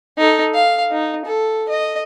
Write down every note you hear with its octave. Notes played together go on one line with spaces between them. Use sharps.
D#4 A4
F5
D#4
A4
D#5